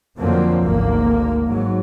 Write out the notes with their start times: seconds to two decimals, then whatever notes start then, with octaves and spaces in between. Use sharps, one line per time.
0.20 F2 D3 F3 F#3 A#3 C4
0.63 G#1 D2 A#3
1.47 G#2 F#3